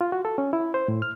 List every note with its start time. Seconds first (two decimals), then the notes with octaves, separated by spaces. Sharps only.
0.01 F4
0.12 F#4
0.25 A4
0.38 C#4
0.53 E4
0.74 C5
0.88 A2
1.02 F6